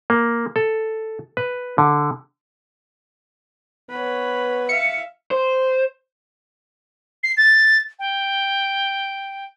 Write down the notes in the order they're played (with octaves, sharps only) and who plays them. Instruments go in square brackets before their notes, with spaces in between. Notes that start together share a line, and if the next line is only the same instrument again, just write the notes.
[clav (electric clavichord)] A#3
A4
B4
D3
[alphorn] B3 [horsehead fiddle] B4 C#5
[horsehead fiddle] E5 F5 [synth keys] C#7
[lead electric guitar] C5
[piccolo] C7
A6
G5